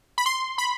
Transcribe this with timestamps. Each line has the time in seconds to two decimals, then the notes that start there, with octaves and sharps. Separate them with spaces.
0.18 B5
0.26 C6
0.58 B5